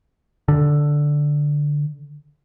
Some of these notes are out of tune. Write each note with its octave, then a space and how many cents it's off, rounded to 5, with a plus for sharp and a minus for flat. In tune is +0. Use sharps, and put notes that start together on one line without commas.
D3 +0